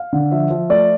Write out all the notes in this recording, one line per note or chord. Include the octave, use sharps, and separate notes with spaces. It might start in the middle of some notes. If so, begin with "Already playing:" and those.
Already playing: F5
D3
F3 E5
F3
A3 D5